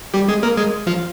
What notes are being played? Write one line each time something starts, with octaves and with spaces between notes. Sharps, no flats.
G3 G4
G#3 G#4
A#3 A#4
G#3 G#4
F3 F4